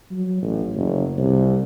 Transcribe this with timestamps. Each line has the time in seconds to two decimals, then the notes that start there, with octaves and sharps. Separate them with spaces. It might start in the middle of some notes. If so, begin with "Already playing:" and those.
0.11 F#3
0.42 A1
0.75 F#1
1.18 C2